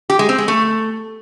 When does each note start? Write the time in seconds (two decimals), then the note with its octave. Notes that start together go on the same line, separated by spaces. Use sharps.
0.10 G4
0.19 G#3
0.29 C4
0.38 G#3
0.48 A3